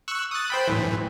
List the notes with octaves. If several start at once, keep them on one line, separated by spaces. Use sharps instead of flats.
C#6 E6 F#6
D#6 F#6 A6
C5 G5 B5
A2 E3